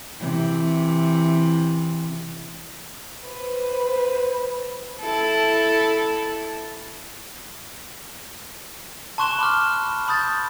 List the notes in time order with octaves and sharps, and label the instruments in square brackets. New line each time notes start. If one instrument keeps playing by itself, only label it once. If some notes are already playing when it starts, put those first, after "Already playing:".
[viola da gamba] C3 E3
[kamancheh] B4 C5
[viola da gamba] E4 A4
[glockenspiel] A5 C6 C#6 F#6 E7 G7
B5 D6 F6
A5 B5 D#6 G6 A6